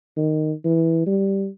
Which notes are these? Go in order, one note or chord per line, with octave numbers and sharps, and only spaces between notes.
D#3
E3
G3